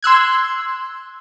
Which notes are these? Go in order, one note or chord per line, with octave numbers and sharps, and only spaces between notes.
C6 E6 F#6 G#6